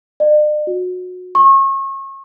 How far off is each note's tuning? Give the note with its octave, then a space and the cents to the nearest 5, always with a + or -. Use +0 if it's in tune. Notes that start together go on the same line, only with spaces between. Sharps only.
D5 +45
F#4 -25
C#6 -35